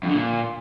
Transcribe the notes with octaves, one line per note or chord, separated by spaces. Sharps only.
F2
D3
A#2